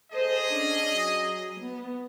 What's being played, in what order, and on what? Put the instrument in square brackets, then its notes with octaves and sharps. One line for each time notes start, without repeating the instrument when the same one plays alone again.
[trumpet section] G#4 D#5 [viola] A4 C5
[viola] C#4 D4
F#3
B3